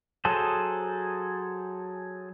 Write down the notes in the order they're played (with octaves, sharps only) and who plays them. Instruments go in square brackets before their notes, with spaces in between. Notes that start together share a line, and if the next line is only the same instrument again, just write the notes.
[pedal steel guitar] F#3 G#4 A4 C5